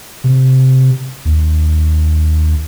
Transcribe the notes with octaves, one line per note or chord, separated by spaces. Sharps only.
C3
D#2